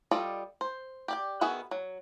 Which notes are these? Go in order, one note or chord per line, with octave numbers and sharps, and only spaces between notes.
G3 F4 A4 D5 D#5
C5
G4 D5 G5
D#3 B3 F#4 G#4 E5
F#3